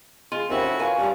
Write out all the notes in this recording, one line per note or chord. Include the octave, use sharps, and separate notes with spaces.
G#3 F4
D#2 C4 C#4 E4 F#4
A2
F4 A#4 B4 C#5 G#5
G2